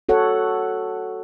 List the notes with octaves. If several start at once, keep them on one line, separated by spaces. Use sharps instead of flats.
F#4 A4 C#5 F#5